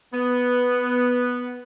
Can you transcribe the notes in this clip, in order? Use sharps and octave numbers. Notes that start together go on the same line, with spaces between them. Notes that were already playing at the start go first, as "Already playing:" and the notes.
B3